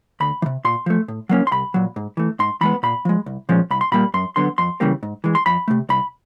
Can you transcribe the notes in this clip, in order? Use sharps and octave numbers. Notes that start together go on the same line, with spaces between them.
D2 B5
E3
C3
A#2 C6
F3 A3
A2
F#3 A#3 C#4
C6
C2 B5
A#2 F#3
G#2
E3 A3
G#2 C6
E3 G#3 B3 B5
A#2 B5
F3 G#3
C2
A#2 F3 G#3 C#4
C2 B5
C6
A#2 G3 A#3 B5
F#2 C6
D3 F#3 B3 C6
F2 C6
C#3 E3 G3 A#3
G#2
E3 G#3
C6
F2 B5
C3 F3 A3
C2 B5